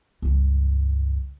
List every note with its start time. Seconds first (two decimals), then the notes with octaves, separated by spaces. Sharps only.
0.22 C#2 G2